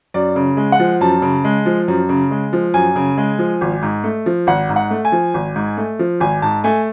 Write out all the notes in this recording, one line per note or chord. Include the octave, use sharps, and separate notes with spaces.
F#2 D5
C#3
G#3
F#5
F3
F#2 A5
C#3
G#3
F3
F#2
C#3
G#3
F3
F#2 G#5
C#3
G#3
F3
G#1
G#2
A3
F3
G#1 F#5
G#2
F#5
A3
G#5
F3
G#1
G#2
A3
F3
G#1 G#5
G#2 A5
A3 G#5